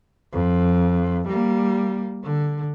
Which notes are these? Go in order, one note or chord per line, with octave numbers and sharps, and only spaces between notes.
F2
G3 A#3
D3